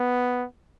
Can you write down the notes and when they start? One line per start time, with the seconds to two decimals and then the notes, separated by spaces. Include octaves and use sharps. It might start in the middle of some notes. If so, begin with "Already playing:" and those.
Already playing: B3